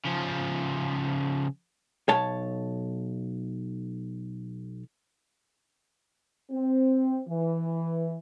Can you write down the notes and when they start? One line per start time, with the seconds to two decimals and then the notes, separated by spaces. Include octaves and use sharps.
0.05 C#3 F3
2.08 B1 C#5 A5
6.51 C4
7.28 E3